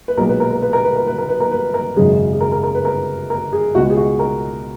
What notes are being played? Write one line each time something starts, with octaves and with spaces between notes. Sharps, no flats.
B4
B1 A#2 G#3 A#4
B4
A#4
A#4
B4
A#4
B4
A#4
B4
A#4
B4
A#4
B4
A#4
G#1 F#2 C#3 G#3 G#4
G#4
A#4
A#4
A#4
B4
A#4
A#4
G#4
C#2 B2 G#3 F#4
G#4
F#4
A#4